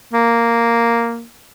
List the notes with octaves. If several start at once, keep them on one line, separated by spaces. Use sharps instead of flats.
A#3